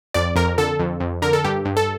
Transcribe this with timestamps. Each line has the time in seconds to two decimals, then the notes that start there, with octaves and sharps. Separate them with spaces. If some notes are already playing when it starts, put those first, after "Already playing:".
0.14 F2 D5
0.36 F2 A#4
0.58 D3 A4
0.80 F2
1.00 F2
1.22 D3 A#4
1.33 A4
1.44 G2 G4
1.65 G2
1.77 A4